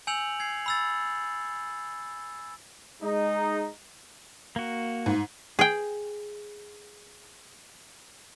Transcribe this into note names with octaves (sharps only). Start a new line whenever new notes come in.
G#5 E6 G6 C#7 F7 F#7
G#6 C7
B5 E6 A6
G#3 D#4
A#3 F#4
G#2
G#4 G5